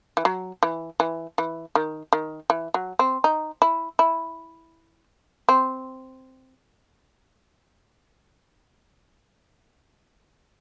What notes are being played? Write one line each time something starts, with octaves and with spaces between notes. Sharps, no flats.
E3
F#3
E3
E3
E3
D#3
D#3
E3
F#3
C4
D#4
E4
E4
C4